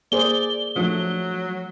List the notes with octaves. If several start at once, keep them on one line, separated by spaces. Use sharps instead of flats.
A#3 G#4 C5 D5 G7
F3 F#3 A3 D4